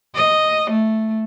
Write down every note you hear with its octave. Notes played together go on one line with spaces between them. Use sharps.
D#5
A3